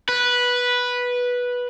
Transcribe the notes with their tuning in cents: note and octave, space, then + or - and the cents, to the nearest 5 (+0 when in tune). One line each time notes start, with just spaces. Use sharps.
B4 -10